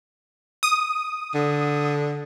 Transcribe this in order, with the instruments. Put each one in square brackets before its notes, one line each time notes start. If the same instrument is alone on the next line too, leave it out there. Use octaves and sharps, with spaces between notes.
[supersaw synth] D#6
[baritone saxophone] D3